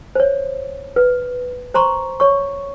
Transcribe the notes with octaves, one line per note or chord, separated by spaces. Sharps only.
C5 C#5
B4
C5 A#5 C6 C#6
C#5 C#6